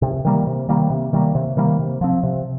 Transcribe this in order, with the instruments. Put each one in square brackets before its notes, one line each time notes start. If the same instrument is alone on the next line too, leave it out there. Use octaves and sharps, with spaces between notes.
[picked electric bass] C3
D#3 G3 A#3
C3
D#3 G3 A#3
C3
D#3 G3 A#3
C3
D#3 G3 A#3
C3
F3 C4
C3